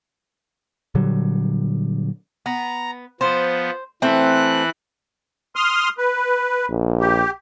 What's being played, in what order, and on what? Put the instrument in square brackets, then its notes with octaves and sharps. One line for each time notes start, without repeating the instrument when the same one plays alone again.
[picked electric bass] A#2 D3 F#3 G3
[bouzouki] B3 [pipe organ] A#5
[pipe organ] F3 B3 [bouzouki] C5
[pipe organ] E3 F#6 [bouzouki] A3 C4
[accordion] C6 D#6 F6
B4
[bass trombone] A#1
[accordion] G4